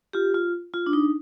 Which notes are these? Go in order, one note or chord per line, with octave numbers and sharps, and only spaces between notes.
F4 G4
F4
F4
D4
D#4